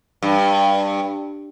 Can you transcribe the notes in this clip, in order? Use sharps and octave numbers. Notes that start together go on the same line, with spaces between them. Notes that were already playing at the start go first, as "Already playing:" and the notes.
G2